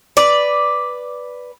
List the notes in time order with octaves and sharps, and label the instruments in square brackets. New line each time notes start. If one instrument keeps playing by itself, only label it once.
[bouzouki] B4 D5